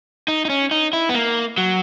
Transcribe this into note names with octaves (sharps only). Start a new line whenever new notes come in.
D#4
D#4
C#4
D#4
E4
B3
A#3
F#3